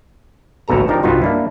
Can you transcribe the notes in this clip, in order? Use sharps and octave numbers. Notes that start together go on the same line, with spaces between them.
A1 D2 B2 A4 A#5
F3 D4 D#4 G4 A#4
C2 G2 B3 D#4 F4 F#4
A#3 D4 E4